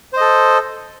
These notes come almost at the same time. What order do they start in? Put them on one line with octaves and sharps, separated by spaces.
C5 D#5 A4